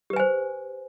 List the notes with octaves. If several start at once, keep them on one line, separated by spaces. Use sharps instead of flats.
G4 B4 C5 G#5